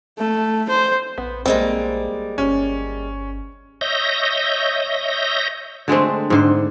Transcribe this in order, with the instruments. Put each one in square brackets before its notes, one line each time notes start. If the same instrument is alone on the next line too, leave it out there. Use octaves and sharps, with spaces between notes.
[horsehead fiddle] A3
C5
[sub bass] A#1 [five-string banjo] B3
[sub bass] A#1 [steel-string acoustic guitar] G3 G#3 A#3 [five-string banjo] C4
[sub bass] G1 [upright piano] C#4
[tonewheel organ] C#5 D#5 E5 G6 A#6
[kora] D3 G#3 A3 C4
G#2 D3 C5